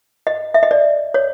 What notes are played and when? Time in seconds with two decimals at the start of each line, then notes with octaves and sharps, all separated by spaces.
0.27 D#5
0.54 E5
0.63 D#5
0.71 D5
1.14 C#5